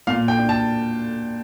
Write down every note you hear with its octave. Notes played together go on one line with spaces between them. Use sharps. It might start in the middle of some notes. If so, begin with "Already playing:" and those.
A#2 F5
G5
D4
A5